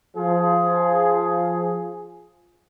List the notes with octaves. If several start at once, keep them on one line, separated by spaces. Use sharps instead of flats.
F3 G#4